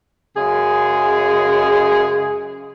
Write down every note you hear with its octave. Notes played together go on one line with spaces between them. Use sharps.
F#2 C#3 G#3 G#4